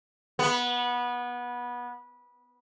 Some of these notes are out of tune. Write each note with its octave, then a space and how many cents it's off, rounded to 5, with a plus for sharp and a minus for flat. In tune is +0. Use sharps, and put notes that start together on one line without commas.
B3 -20